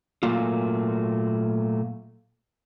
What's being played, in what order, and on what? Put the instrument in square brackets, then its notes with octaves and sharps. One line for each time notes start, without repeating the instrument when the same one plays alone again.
[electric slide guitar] A#2 D#3 F#3 A3 A#3 F4